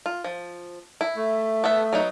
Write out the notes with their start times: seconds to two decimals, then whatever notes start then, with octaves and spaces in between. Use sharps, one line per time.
0.06 F4
0.24 F3
1.01 E4
1.16 A3
1.64 B3 A4 E5
1.93 F#3 B3 D#4